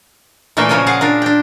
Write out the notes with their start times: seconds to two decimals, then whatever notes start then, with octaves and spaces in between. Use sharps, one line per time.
0.57 A#2 E3 A3 A#4 B4 E5
0.69 A#2 C#3 F3 A#4 C#5 G#5
0.86 F4 G#4 F5 F#5
1.01 D4 F4 A#4
1.22 D4 G5